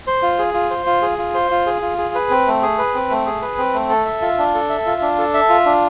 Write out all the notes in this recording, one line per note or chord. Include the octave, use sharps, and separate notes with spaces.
C5
F4
G#4
F4
C5
F4
G#4
F4
C5
F4
G#4
F4
G#4
B4
C4
A3
G#4
B4
C4
A3
G#4
B4
C4
A3
A4
E5
F4
D4
A4
E5
F4
D4
A4
E5
F4
D4